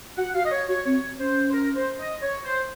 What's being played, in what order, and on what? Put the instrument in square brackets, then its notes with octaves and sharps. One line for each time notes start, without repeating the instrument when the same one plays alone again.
[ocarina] F#4 [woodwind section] F#5
[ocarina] F#4 [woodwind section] F5
[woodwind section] D#5
C#5
[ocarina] F#4 [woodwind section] C#5
[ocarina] C4 [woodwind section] C#5
[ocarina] C#4 [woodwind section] C5
[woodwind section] C5
A#4
C5
D#5
C#5
C5